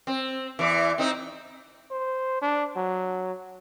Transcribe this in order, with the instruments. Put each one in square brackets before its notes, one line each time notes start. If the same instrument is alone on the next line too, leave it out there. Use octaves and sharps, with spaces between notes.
[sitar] C4
E2 E3
C4 D#4
[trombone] C5
D4
F#3